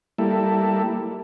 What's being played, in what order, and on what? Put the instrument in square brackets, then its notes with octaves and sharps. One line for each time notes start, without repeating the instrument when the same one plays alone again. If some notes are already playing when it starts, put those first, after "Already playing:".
[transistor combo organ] G3 A#3 E4 A4